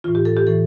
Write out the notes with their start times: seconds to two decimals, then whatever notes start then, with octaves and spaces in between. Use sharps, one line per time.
0.04 A2 E3 F4
0.15 G4
0.25 A4
0.37 G4
0.47 A2 E3 A4